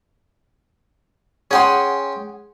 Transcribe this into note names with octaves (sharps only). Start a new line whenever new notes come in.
C#4 G#4 F#5 G5 C6